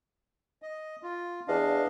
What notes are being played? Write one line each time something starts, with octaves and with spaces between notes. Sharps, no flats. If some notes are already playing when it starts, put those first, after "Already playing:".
D#5
F4
E2 D4 D#5 F5